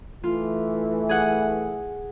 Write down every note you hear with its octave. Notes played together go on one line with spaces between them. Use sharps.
E3 A3 F4
G#4 F#5